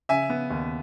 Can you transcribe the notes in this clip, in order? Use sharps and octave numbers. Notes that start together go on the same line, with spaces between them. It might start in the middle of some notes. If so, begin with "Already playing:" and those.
C#3 E5 G#5
B3
D#2